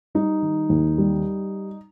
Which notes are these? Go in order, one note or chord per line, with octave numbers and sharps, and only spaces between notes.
G3 D#4
D#3
D#2
G3